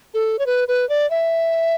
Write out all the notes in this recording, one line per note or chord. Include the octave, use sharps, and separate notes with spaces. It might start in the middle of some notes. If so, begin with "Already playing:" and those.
A4
C#5
B4
B4
D5
E5